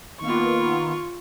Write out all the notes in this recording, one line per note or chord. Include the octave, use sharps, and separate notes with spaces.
D#3 A#3 B3 F4 C#6